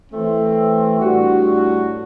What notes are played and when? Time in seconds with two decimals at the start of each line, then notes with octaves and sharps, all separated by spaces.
0.11 E3 A3 C4
0.98 A2 G3 D4 F#4